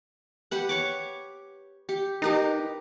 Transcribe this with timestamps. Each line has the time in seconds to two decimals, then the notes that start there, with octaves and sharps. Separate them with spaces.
0.51 G4 B4 F#5
0.69 C#5 C#6 D6
1.89 G4
2.22 D#4 G4 A#4 B4